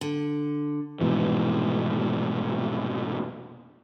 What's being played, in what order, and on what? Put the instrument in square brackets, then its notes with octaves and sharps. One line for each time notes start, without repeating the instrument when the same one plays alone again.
[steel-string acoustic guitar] D3
[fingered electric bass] F1 G#2 B2 E3